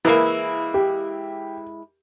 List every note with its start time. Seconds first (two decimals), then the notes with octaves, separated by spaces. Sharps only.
0.05 E3 G#3 A#3 E4
0.74 G4